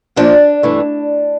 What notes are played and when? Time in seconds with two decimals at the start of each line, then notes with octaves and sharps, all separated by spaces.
0.16 A#2 F3 A#3 D4
0.63 G2 E3 A3